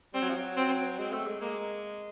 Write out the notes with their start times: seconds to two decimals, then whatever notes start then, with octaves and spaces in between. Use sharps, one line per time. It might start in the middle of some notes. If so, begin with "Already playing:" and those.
0.14 G3 C4
0.22 F#3
0.30 F3
0.37 F#3
0.57 C4
0.99 G#3 C4
1.13 A3
1.27 G#3
1.41 G#3 A#3